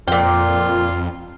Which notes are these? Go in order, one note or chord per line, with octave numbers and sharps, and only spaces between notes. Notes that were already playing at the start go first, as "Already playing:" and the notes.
F2 A#2 F4 G5